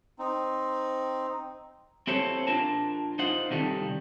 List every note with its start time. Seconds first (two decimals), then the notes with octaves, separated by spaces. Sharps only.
0.19 C4 D#4
2.07 C4 E4 G4 A4 C5 C#5
2.47 D4 F4 A#4 A5
3.19 D#4 F4 C5 F#5
3.51 C3 D#3 G3 A4